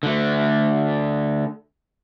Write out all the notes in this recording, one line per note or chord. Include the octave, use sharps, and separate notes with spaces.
D3 A3